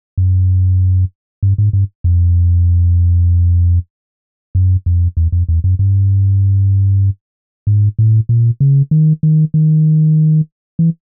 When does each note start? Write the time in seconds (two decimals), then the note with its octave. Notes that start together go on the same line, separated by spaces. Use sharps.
0.18 F#2
1.43 G2
1.58 G#2
1.73 G2
2.04 F2
4.55 F#2
4.86 F2
5.17 E2
5.32 F2
5.49 E2
5.64 F#2
5.79 G2
7.67 G#2
7.99 A2
8.29 A#2
8.60 C#3
8.91 D#3
9.23 D#3
9.54 D#3
10.79 E3